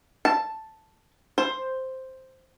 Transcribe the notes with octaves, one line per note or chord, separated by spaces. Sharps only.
A5
C5